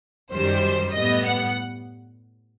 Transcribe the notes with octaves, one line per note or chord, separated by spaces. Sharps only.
F#2 D#3 G3 C5
A2 G3 B3 D#5
F#5